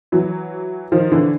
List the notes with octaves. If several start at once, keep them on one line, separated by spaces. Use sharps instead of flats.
E3 F#3
D#3 F3
D3 E3